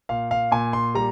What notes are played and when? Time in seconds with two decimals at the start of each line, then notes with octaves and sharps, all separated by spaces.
0.09 A#2 F5
0.31 F5
0.51 A#2 G#5
0.73 C6
0.95 G3 A#5